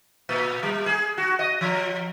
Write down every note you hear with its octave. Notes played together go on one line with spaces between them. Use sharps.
A#2
G3
G#4
F#4
D#5
F3